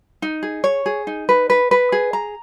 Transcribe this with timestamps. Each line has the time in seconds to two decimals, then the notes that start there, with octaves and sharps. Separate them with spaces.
0.22 D#4
0.43 G#4
0.64 C#5
0.86 G#4
1.07 D#4
1.29 B4
1.50 B4
1.71 B4
1.92 G#4
2.13 A#5